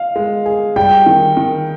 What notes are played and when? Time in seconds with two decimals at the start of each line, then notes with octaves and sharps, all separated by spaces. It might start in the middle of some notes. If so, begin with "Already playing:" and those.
Already playing: D#5 F5
0.16 G#3
0.46 G#4
0.76 G3 G5
1.06 D#3
1.37 D#3